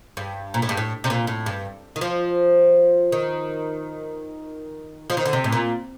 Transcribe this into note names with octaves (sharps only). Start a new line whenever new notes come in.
G2
A#2
A2
G2
A2
C3
A#2
A2
G2
D#3
F3
D#3
F3
D#3
D3
C3
A2
A#2